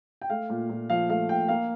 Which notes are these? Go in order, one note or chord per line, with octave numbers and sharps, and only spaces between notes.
G5
A3 F5
A#2
A#2
F3 F5
A3 F5
A#2 G5
A#3 F5